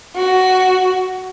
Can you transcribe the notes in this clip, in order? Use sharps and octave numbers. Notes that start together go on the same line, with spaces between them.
F#4